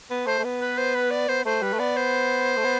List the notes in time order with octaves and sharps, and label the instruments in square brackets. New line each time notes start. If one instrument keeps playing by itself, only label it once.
[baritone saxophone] B3
[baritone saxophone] A3 [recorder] C5
[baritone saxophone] A3
B3
[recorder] B4
C5
B4
D5
[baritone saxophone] B3 [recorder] C5
[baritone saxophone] A3 [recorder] C5
[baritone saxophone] G3 [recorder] B4
[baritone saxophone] A3
[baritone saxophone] B3 [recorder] D5
[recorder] C5
[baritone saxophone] A3
B3